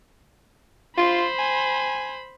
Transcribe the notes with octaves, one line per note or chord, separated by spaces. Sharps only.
F4 C5 B5
G#5